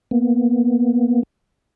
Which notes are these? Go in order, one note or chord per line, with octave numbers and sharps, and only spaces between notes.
A#3 B3